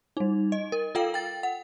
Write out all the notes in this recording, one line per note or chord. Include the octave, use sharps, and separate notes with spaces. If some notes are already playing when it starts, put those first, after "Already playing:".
G3 D#4
D#5
A#4
F4 A4 F5 G5
G5 A6
F#5